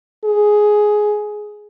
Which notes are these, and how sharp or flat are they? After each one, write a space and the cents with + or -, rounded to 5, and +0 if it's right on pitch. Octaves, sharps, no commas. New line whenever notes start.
G#4 +10